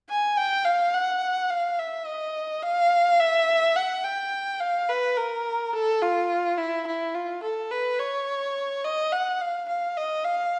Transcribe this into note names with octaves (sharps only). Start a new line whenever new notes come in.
G#5
G5
F5
F#5
F5
E5
D#5
F5
E5
F#5
G5
F5
B4
A#4
A4
F4
E4
E4
F4
A4
B4
C#5
D#5
F#5
F5
F5
D#5
F5